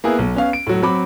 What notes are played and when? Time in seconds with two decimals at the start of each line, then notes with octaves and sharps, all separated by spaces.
0.04 A#3 B3 E4 G#4
0.19 B1
0.35 B3 C#4 F5
0.53 D7
0.67 A2 F#3
0.82 F#3 C4 B5 D6